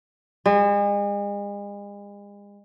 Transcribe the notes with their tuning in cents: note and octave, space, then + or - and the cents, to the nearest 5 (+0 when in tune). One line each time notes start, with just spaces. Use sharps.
G#3 -40